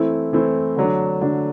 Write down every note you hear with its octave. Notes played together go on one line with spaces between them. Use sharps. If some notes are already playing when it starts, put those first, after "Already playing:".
Already playing: E3 A3 C4 E4
E3 A3 C4 E4
D3 F#3 A3 D4
D3 F#3 A3 D4